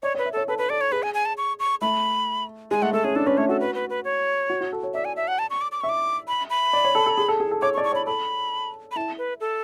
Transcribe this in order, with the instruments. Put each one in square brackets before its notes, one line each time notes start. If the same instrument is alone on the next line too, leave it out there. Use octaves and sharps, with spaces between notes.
[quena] C#5 [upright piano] D5
[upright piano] C#5
[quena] B4
[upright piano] E5
[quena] A4 [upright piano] C#5
[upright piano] A4 [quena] B4
[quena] B4
[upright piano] A4 [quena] D5
[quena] C#5
[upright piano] G#4 [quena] B4
[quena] G#5
G#5
A5
C#6
C#6
[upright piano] A3 [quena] B5
[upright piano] G#3 [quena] G#5
[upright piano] A3 [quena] F#5
[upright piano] A3 [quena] A4
[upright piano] C#4 [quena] G#4
[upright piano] D4 [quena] A4
[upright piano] C#4 [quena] B4
[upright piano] A3 [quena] C#5
[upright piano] F#4 [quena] A4
[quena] B4
B4
B4
C#5
[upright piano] F#4
F#4
A4
C#5
[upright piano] D5 [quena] E5
[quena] G#5
E5
F#5
A5
C#6
D6
D6
[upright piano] E5 [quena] C#6
[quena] D6
B5
B5
[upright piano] D5
C#5
A4
A4
G#4
A4
G#4
A4
[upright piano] C#5 [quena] D6
[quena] C#6
[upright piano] D5
[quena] C#6
[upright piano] C#5 [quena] B5
[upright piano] A4 [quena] B5
[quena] B5
[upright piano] E4 [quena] A5
[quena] B4
A4